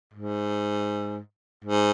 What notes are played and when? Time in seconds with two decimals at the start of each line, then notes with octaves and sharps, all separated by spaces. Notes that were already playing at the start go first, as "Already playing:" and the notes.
0.14 G#2
1.65 G#2